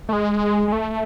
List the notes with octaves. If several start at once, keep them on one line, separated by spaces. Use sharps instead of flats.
A3
G#3
G#3
A3